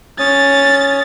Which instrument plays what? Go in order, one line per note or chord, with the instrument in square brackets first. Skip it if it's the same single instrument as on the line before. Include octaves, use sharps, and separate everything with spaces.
[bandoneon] C#4 C#5 D#6 [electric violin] A6